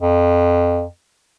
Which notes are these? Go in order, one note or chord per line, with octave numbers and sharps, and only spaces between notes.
F2